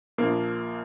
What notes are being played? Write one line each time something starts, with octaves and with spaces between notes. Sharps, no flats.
A#1 A#2 F3 A#3